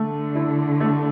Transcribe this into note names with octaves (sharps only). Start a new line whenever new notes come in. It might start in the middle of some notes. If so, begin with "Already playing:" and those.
Already playing: D3 A3
E4
A3